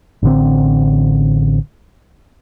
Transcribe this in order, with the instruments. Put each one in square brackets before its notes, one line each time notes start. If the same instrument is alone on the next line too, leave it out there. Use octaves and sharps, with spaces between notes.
[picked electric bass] A1 D3 C4